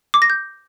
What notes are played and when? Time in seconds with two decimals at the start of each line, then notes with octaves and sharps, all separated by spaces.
0.14 D6
0.22 A#6
0.30 G6